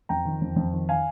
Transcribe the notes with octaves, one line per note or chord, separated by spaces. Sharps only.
F2 G5 A#5
D#3
F2
F2
D#3
D#3 F5 G#5